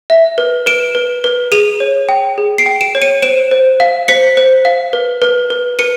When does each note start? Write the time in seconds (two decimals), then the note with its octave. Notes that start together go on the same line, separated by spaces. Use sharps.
0.10 E5
0.38 B4
0.66 B4 D7 E7
0.95 B4
1.24 B4
1.52 G#4 D#7 F7
1.80 C#5
2.09 G5
2.38 G#4
2.58 C7 D7
2.66 G5
2.81 D7 E7
2.95 C#5
3.02 C#7 D#7
3.22 C5 D7 E7
3.51 C5
3.80 F5
4.08 C5 B6 C#7
4.37 C5
4.65 F5
4.93 B4
5.22 B4
5.50 B4
5.79 B4 C#7 D#7